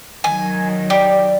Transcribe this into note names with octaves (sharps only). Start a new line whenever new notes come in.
D#3 F#3 G#5
G4 D5